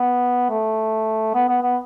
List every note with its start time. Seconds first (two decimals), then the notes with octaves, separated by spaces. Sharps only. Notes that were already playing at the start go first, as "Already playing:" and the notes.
Already playing: B3
0.50 A3
1.34 B3
1.48 B3
1.62 B3